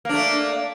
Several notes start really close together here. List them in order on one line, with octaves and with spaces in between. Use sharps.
A#3 D4 A3